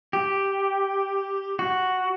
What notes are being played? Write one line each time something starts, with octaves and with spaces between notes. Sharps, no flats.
G4
F#4